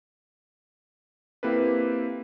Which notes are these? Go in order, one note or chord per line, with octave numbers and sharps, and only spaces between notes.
A#3 C4 E4 G4 A4 B4